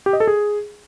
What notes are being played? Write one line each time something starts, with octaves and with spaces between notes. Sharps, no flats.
G4
D#5
A4
G#4